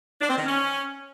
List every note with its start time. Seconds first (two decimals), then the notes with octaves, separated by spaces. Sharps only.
0.21 D4
0.29 C4
0.38 D#3
0.46 C#4